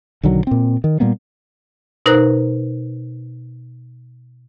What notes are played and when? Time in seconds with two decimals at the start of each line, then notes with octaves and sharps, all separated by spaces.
0.23 B1 D3 D#3 F#3
0.47 A#2 C4
0.84 D#3
1.00 A#2 G3 A#3 B3
2.06 B2 D#4 A#4 C5 A#5 F#6